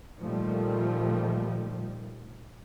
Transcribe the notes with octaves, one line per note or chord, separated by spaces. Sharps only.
A#2 D#3 F3 G3 A3